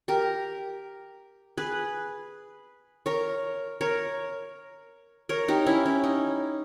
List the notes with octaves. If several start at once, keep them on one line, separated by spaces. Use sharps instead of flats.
G4 A#4
G#4 B4
A#4 C#5
A#4 C#5
A#4 C#5
D#4 G4
C#4 E4
C#4
D#4